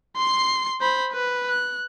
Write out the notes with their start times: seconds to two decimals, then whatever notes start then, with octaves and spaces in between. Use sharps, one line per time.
0.17 C6 C7
0.81 C5 B5
1.13 B4
1.49 F#6